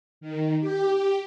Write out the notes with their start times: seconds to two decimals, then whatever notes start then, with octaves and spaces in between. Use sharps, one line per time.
0.21 D#3
0.60 G4